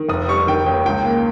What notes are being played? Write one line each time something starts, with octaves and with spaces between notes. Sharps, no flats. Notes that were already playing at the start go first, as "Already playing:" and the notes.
Already playing: D#3
F1 D#6
G3 C#6
D#3 G5
D#2 G5
C#2 G5
A#3